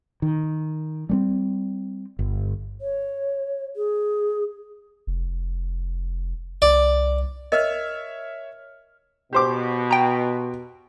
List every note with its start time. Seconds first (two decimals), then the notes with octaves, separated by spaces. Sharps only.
0.22 D#3
1.09 G3 A3 C4
2.19 G1
2.81 C#5
3.76 G#4
5.07 F1
6.62 C2 D5
7.52 A#4 C#5 D#5 E5 F6
9.33 B2 G4 C5 D6
9.91 G5 A#5